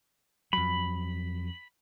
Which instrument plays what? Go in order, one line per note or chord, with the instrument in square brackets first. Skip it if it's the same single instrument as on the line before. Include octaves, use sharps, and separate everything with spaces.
[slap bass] F2 F#3 [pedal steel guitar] B5